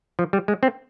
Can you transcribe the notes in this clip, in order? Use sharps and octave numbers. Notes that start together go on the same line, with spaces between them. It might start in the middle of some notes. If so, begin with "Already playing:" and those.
F3
G3
G#3
C4